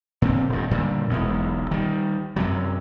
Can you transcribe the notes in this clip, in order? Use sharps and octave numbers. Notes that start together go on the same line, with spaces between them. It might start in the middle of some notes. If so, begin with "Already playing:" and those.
A#2 D3 C4
D#1 G2
A#2 D3 G3
E1 B1 E2
D#3 G3
F#2 C3 F#3